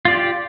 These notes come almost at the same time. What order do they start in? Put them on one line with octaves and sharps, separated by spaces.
F4 D5 G4